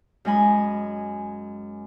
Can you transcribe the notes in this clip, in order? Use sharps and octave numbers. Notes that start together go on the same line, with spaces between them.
F#2 G#3 D#5 G#5 B5